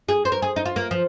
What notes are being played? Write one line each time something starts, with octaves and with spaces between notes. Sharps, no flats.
G#4
C5
A#4
G#4
D#4
F4
A#3
F3